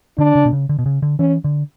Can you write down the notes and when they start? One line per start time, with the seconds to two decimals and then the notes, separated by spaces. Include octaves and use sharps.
0.18 D3 D4
0.35 C#3
0.46 B2
0.53 C#3
0.69 D3
0.79 B2
0.86 C#3
1.02 D3
1.19 E3 C#4
1.44 D3